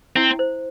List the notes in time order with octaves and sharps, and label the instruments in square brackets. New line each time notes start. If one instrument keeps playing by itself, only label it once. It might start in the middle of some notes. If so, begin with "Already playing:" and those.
[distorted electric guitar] C4 [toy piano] E4 E5
[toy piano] C5